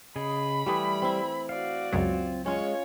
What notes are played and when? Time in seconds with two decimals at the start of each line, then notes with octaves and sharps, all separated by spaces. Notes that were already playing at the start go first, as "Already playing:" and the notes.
0.16 C#3 G#4 D#5 B5
0.66 E3 G3 A3 G4 D#6
1.02 C4 E4
1.49 F#4 D5 F5
1.92 C#2 F#2 F#3 C4 F4 C#5
2.46 G#3 C#4 F4 C#5